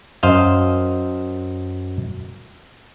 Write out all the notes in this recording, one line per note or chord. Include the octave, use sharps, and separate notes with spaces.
F#2 C5 D#5 F5